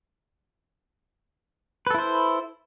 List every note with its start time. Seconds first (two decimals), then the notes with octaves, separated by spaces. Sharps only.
1.87 B4
1.90 A4
1.94 E4
1.98 C5